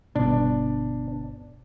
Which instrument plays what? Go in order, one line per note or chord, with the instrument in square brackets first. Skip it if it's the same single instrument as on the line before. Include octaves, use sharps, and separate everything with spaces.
[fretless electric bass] G1 B2 [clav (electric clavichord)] D4